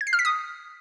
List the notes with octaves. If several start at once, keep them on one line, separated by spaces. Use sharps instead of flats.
G#6
C7
F6
B6
D#6